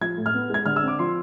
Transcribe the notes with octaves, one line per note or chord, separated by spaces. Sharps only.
F3 G#6
A2
F6
B3
G#3 G#6
D3 F6
E6
C4 D6
F3 C6